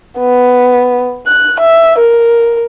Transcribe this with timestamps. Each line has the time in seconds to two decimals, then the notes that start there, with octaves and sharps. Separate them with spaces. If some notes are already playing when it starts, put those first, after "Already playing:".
0.18 B3
1.27 F#6
1.59 E5
1.98 A#4